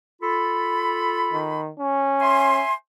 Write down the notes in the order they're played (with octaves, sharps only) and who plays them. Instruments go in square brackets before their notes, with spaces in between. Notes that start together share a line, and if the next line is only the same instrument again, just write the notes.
[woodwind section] F4 A4 B5
[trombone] D#3
C#4
[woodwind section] E5 G#5 C6